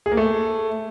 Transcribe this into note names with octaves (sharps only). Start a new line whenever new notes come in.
G#4
A#3
A3